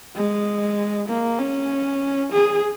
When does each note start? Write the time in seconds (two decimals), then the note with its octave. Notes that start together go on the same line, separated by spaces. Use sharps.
0.16 G#3
1.08 A#3
1.39 C#4
2.32 G#4